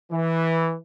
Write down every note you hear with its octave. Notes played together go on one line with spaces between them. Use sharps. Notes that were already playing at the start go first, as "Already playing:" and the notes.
E3